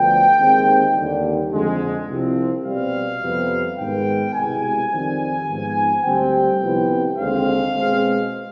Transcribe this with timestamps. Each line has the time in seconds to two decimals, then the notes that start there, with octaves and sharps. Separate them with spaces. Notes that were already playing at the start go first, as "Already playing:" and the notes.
Already playing: D2 D3 F3 B3 G5
0.38 D#2 D#3 G#3 C4
0.95 D#2 D3 G3
1.51 F2 D3 G#3
2.08 C2 C3 F3 C4
2.64 B2 G3 C4 F5
3.21 F2 C3 G3 B3
3.78 G#2 D#3 G#3 B3 G5
4.34 C2 B2 G#3 G#5
4.91 F2 D#3 G3 C4
5.48 G#2 F3 B3
6.04 D2 D3 G3 C4 G5
6.61 C2 C3 F3 B3
7.17 D#2 D3 G#3 C4 F5
7.74 B2 G#3 C4